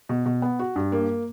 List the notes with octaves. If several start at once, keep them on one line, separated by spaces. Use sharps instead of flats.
B2
B2
B3
F#4
G2
A#3